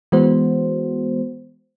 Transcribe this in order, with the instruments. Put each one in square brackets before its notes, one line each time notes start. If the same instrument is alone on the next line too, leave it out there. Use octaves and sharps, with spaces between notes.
[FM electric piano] E3 G#3 B3 F#4 C5